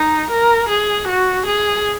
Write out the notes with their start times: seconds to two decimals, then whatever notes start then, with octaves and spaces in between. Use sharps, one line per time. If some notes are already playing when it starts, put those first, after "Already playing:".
Already playing: D#4
0.31 A#4
0.69 G#4
1.08 F#4
1.46 G#4